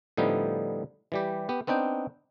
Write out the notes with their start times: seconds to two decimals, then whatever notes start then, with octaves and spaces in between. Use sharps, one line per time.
0.17 A2 D3 F3 G3 B3 D#4
1.12 E3 G3 G4
1.49 B3 G4
1.67 B3 C4 D4 D#4 G5